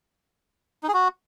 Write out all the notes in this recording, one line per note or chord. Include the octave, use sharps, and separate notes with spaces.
D#4
G#4
F#4